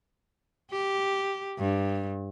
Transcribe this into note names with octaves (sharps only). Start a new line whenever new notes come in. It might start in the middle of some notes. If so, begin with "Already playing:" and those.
G4
G2